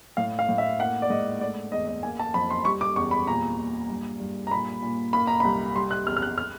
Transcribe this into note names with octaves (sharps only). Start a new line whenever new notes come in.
A2 F5
F5
A2
E5
A#3 F#5
D5
G#2 D#5
A3 D5
E2 D#5
D#5
A#3 G#5
A5
F2 B5
C6
G3 C#6
D6
E2 C#6
B5
A#2 A#5
A#2
G2
G2
A#5
A#2 B5
A#2
A#3 B5
A#5
C2 B5
G3 C6
F#6
E2 F6
F6
F#6
F6